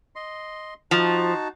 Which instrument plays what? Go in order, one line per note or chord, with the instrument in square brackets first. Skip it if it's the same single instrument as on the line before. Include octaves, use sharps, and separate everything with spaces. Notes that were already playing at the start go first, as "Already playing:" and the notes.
[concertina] D#5 C6
[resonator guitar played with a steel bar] F3 [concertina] D#4 F#4 A5